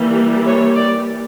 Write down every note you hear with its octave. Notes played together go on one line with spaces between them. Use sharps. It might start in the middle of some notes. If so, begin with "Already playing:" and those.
Already playing: E3 G3 A#3
C#5
D5